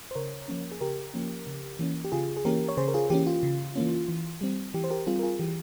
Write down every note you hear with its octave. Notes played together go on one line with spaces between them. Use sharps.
C5
C#3 A#4 C#5
F3 A#3 C#4
G#4
C#3 G4 A#4
F3 A#3 C#4
C#3
E3 A#3 C#4
G4
C#3 F4 G#4
G#4
E3 A#3 C#4 G4 A#4
C#5
C#3 G#4 C5
A#4
F4 G#4
E3 A#3 C#4 G4
F4
C#3
E3 A#3 C#4
E3
G3 C4
E3 G4
C5
G4 A#4
G3 C4 F4 G#4
A#4
F4 G#4
E3 G4